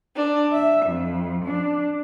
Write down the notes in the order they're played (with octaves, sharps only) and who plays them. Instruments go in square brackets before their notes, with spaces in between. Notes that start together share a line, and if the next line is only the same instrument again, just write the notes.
[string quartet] D4
E5
F2
D4